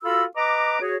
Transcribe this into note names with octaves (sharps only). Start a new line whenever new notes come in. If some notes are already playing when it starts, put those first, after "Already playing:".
F4 F#4 A4 F5 B5 E6
B4 D#5 A#5 D6
F#4 G#4 C#5